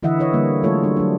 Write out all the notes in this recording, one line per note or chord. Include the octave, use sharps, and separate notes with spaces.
D3 E3 E4 D#5 E5 F#5
E4 B4 C#5 D#5
D3 G3 A#3
F#3 G#3 A3 F4 A4 C#5
G3 D4
F#3 D4